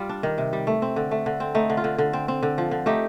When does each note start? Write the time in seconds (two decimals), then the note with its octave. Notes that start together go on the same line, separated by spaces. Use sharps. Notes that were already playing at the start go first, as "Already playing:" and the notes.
Already playing: G3 F4
0.09 D4
0.23 D#3
0.38 C3
0.53 G3
0.67 A3
0.82 C4
0.96 D3
1.11 A3
1.26 D3
1.40 C4
1.55 A3 D#4
1.70 D3
1.77 F4
1.84 D3
1.98 D3
2.13 C4
2.28 C4
2.43 D3
2.58 F3
2.71 D3
2.86 A3 D#4 G4